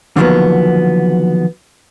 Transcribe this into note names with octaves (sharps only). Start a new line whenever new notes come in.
D3 D#3 F3 F#3 A#3 B3